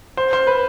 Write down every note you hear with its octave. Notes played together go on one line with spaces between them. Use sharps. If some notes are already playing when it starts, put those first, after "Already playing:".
C5
C5
B4